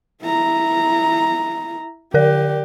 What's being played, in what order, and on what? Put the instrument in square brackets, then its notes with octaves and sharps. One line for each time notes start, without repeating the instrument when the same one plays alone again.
[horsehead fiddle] E4 A#5
[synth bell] D3 A#4 D5 [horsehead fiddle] G4